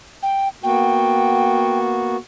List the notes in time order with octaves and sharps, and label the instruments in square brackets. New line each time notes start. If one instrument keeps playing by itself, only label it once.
[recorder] G5
[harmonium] A#3 B3 F#4 [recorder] G5